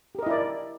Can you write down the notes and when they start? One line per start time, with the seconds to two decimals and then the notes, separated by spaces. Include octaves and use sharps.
0.15 G4
0.19 A#4
0.23 D#5
0.27 E4
0.30 D5